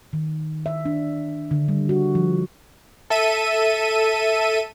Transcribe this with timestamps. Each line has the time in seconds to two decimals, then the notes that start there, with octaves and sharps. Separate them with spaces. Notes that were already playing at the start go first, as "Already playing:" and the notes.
0.13 D#3
0.66 E5
0.85 D4
1.51 D3
1.68 G3
1.89 F#4
2.15 F3
3.10 A4 E5 D#7